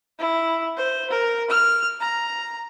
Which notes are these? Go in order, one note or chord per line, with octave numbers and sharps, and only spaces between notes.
E4
C5
A#4
F6
A#5